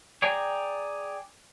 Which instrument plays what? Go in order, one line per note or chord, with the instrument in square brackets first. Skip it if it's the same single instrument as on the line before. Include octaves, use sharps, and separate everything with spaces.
[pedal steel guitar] G#4 D5 G5 G#5 A#5